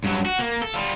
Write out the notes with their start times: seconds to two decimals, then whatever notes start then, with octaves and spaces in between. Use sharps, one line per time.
0.04 G2 F#3
0.26 F#4
0.39 A#3
0.62 A4
0.74 G3 F4